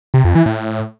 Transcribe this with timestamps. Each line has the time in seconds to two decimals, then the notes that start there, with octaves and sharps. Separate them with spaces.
0.14 C3
0.25 F2
0.35 E3
0.46 A2